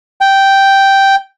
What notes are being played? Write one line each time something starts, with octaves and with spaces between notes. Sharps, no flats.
G5